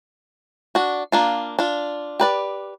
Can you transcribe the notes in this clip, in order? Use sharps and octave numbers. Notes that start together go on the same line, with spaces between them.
D4 F#4
A#3 D4 F4
D4 F4
G4 B4 D5